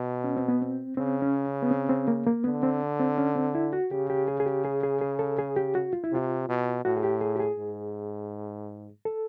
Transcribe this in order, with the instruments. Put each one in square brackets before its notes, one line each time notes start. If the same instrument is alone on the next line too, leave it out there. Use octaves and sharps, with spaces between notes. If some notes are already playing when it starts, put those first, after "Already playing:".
Already playing: [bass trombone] B2
[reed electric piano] C#4
C4
B3
C4
[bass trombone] C#3 [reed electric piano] C4
[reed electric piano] C#4
B3
C4
C4
A#3
A#3
[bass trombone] D3 [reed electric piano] B3
[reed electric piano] C4
C4
C#4
C4
E4
F#4
[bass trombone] C#3 [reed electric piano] G4
[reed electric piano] G4
G#4
G#4
G4
G#4
G#4
G#4
A4
G#4
G4
F#4
F4
E4
[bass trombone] C3 [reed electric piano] F4
[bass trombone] B2
[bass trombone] A2 [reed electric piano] F#4
[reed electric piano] G#4
G4
G#4
G4
G#4
[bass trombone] G#2
[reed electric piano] A4